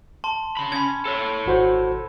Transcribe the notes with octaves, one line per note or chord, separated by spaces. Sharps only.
A5 C6
C#3 B5
C#4 B5 G#6
A4 C#5
G#1 F#4 C5